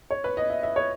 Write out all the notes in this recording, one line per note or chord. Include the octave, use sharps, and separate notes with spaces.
C#5
B4
D#5
E5
E5
C#5